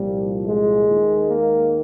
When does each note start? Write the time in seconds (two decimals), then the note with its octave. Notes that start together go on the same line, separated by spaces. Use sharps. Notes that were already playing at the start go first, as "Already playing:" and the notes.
Already playing: C2 A#2 F3 G3
0.45 G#3
0.88 D#2 D#3
1.30 A#3